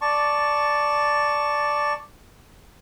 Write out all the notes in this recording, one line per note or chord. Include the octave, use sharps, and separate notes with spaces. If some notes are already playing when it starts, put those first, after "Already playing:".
D5 A5 C#6